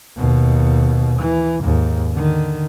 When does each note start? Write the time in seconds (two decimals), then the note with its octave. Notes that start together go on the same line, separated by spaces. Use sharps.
0.17 D#2 B2
1.20 E3
1.62 D#2 G#2
2.12 D3 D#3